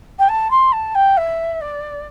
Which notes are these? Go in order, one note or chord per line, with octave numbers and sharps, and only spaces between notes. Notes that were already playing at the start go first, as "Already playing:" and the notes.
G5
A5
C6
A5
G5
E5
D5